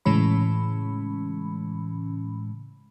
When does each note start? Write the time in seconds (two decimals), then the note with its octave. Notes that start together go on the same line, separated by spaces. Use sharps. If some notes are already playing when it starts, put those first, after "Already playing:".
0.05 A2 C#3 E3 G#3 C#4 B5